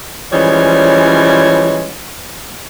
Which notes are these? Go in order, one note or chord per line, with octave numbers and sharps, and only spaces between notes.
E3 F3 G3 G#3 C#4 C#5